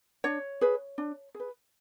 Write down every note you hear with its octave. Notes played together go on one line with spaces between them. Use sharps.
D4 C#5
G#4 B4
D4
G#4
B4